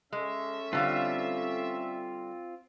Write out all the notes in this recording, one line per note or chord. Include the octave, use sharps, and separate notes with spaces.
G#3 C#4 A4 E5
D3 G3 C4 F4 F5